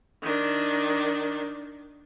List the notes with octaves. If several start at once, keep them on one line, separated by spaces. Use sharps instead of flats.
D#3 D4